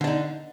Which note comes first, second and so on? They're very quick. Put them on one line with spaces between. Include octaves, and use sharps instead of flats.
D3 D4 D#4